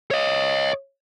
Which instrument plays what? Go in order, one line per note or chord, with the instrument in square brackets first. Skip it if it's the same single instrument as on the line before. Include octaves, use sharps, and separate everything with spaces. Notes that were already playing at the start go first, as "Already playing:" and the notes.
[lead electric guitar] C#5 D#5